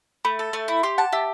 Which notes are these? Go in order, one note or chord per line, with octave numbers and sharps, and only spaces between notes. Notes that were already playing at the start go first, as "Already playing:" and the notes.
A3 B5
A4
A3
E4
G4 C6
F#5 A5
G4 E5